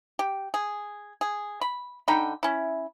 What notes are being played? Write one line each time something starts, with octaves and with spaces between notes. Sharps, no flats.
G4
G#4
G#4
B5
D3 D#4 G5 B5
C#4 E4